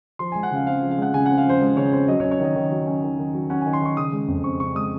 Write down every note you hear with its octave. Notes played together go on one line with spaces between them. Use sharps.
F3 C6
G#3 G#5
F#5
C#3 F5
C4 F5
F3
F5
G#3 F#5
C#3 G#5
C4 F#5
F5
F3 C5
G#3
C#3 C#5
C4 C5
F#3 D#5
C#5
C#4
C#5
D#3 D#5
D#3
F#3
C#4
D#3
D#3
F#3
C#4 F#5
D#3 G#5
C6
D#3 C#6
C#3 D#6
G#3
F2
C4 C#6
C#3 C#6
G#3 D#6